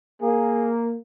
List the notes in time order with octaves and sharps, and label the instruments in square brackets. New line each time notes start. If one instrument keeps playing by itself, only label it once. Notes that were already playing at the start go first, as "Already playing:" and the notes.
[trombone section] A#3 [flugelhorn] G#4